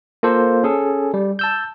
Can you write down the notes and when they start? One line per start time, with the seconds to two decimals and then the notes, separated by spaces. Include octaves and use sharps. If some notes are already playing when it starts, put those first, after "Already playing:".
0.23 A#3 F4 A4 C5
0.63 C#4 G#4 A4
1.14 G3
1.39 A5 E6 G6